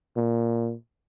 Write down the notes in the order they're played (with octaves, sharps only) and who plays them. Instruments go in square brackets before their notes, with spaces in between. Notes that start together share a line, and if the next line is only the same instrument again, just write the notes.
[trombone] A#2